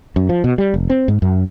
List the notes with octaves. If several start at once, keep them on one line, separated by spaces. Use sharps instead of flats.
F#2
F3
B2
G3
F1
C4
G#2
F#2